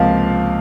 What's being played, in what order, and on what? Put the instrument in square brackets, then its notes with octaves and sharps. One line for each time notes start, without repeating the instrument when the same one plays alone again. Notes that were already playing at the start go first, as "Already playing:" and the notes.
Already playing: [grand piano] C#2 C3 F3 A#3 F5